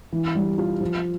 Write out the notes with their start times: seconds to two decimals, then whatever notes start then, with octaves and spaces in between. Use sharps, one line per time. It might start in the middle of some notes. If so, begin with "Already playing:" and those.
0.13 E3
0.35 G3
0.58 F4
0.81 F3